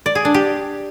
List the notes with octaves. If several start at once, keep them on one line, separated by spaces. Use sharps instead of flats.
D5
G#4
D4
G4